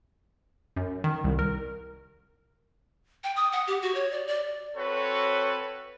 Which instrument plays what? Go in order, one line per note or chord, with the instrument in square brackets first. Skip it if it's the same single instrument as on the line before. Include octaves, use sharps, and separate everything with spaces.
[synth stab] F#2
D#3
C2
A#4
[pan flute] G5
D#6
F#5
G4
F#4
C#5
D5
D5
[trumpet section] C4 F#4 A4 B4 C#5